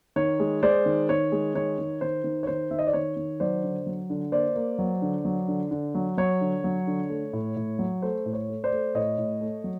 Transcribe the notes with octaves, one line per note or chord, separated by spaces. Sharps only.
D#3 C#5
G#3
G#3 C5 D5
D#3
D#3 C#5
G#3
D#3 C#5
D#3
D#3 C5
D#3
C#5
D#3 C5
D#3 E5
D#5
D5
D#3 C#5
D#3
F#3 C5 D5
D3
F#3
D3
A#3 C5 D5
A#3
F#3
D3
F#3
D3
D3
F#3
F#3 C#5
D3
F#3
D3
A3
A2
A2
F#3
A3 C5
A2
C#5
A3
C5 D5
A3
A2 C#5 D#5
A2
A3
F#3